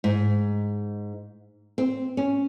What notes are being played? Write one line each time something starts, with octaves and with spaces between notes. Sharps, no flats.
G#2
C4
C#4